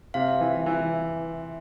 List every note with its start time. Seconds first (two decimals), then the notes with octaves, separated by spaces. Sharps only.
0.14 C3 F5
0.41 E3
0.66 E3